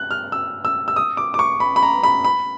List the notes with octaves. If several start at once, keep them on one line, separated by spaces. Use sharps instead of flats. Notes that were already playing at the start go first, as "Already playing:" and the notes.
Already playing: F#6
F6
E6
E6
E6
D#6
D6
D6
C#6
B5
B5
A#5
B5
B5